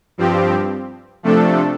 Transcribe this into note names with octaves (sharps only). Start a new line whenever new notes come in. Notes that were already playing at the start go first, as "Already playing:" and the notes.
G2 F3 C4 G4
C3 F3 A3 D4 A4